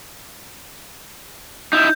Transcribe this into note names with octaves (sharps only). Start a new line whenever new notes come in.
D#4 E4 G6